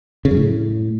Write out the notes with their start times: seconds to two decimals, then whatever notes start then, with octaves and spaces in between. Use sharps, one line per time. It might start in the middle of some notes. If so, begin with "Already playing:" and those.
0.25 C#3
0.31 F#2
0.37 A2